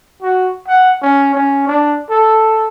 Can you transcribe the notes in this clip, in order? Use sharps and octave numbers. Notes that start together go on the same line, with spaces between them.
F#4
F#5
C#4
C#4
D4
A4